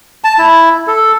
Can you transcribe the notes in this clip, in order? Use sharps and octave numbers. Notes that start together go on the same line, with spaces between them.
A5
E4
A4